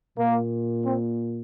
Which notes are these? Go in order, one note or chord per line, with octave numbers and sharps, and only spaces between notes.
A#2 A#3
C4